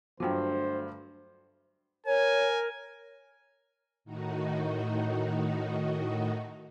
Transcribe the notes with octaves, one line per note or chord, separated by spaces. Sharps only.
D2 G2 F#3 F4 F#4 C5 G5
A#4 C#5 G#5
A2 D#3 D#4 F#4